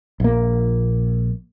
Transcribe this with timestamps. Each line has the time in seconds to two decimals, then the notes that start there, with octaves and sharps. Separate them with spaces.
0.20 A#1 A#3